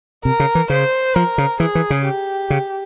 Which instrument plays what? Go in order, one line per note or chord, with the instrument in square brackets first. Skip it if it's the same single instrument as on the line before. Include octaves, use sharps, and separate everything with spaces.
[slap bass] C3 [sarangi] A#4
[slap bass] C#3
E3
[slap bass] C#3 [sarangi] C5
[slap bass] F3 [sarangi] A#4
[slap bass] C#3
[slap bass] E3 [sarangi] G#4
[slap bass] E3
C#3
[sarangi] G4
[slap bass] C#3